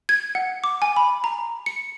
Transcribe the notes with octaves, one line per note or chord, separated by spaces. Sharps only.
G#6
F#5
D6
G#5
B5
A#5
C#7